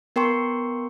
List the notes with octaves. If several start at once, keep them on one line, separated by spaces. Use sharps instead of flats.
B3 A#4 G5 C6 C#6